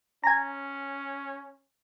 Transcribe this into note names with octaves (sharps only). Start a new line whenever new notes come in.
C#4 G#5 A#5